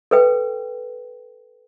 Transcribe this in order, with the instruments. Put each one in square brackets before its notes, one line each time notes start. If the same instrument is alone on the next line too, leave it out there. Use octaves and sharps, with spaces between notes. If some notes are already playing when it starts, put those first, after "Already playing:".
[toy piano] A4 B4 G5